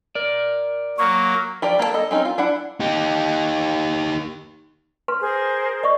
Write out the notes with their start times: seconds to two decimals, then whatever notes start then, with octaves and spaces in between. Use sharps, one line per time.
0.15 A#4 D5
0.98 F#3 A#3 C#6
1.62 F3 G4 A#4 D5
1.79 A#3 A4 A#4 A5
1.94 A4 D#5
2.11 C4 C#4 D#4
2.25 F4
2.38 D4 E4 F#5
2.80 D#4 G4
5.08 B4 C6
5.20 G#4 A#4 C5
5.83 D5 D#5 C#6